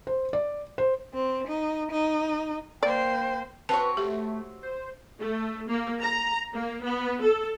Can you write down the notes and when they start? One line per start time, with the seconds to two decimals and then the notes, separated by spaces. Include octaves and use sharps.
0.07 C5
0.33 D5
0.78 C5
1.14 C4
1.46 D#4
1.90 D#4
2.83 A#3 C5 D5 G5
3.69 C4 F#4 B4 C#5 A5
3.97 A3 G4
4.63 C5
5.20 A3
5.69 A#3
6.02 A#5
6.54 A#3
6.84 B3
7.22 A4